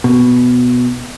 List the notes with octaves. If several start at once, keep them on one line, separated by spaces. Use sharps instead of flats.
B2